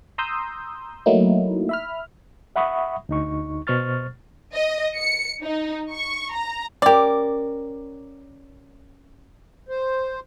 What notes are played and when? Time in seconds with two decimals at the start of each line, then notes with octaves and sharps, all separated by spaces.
0.18 A#5 C6 D#6 E6 G6
1.06 F#3 A3 A#3 D#4 E4
1.69 E5 B5 F6
2.56 E5 F#5 B5 C#6 D#6
3.09 D2 D#4 C#6
3.67 B2 C5 C#6 F6 A6
4.54 D#5
4.97 C#7
5.43 D#4
5.91 C#6
6.34 A#5
6.82 C#4 G4 A#4 D5
9.69 C5